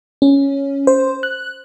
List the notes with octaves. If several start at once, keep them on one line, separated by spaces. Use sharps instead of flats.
C#4
C5
F#6